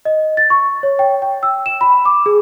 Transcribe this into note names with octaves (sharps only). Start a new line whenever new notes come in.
D#5
A6
C#6
C#5
G5
G5
E6
E7
B5
D6
G#4